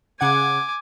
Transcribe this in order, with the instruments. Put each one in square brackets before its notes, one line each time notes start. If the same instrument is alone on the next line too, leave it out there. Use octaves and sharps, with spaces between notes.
[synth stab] C#3 F#5 G#6 [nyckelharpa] G#5 D6